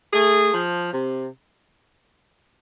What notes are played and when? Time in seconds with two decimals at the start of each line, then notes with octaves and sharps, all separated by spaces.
0.14 A3 G#4
0.54 F3
0.93 C3